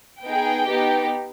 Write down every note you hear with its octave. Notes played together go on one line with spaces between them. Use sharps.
B3 D#4 G#4 G5
B3 D#4 G4